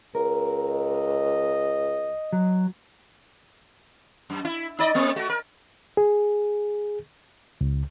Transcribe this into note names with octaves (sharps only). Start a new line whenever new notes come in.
C#2 A#4
D#5
F#3
F#2
E4
D#4 D5 D#5
A3 A#3 C4
A3 F#4
A#4
G#4
C#2